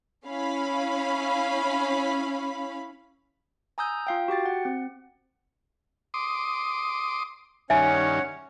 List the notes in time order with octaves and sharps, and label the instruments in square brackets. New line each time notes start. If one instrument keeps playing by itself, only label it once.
[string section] C#4 E4 C#5 F5 B5
[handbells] G#5 A#5 D#6 E6 G6
F4 F5 G5
F#4 G4 G5 A6
F#5
C4
[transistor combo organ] C6 D6 D#6
[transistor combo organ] G2 D#3 [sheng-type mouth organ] C#4 C#5 F#5 [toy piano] E5 G#5